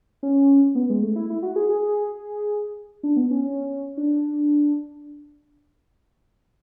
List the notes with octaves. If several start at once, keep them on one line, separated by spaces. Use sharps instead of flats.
C#4
B3
G#3
A3
E4
E4
F#4
G#4
G#4
D4
B3
C#4
C#4
D4